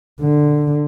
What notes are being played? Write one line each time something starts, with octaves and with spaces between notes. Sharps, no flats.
D3